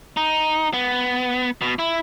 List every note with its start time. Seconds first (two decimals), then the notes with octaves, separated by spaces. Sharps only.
0.17 D#4
0.73 B3
1.62 B2
1.79 E4